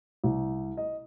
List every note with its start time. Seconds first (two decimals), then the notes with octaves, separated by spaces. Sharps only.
0.24 C2
0.77 D#5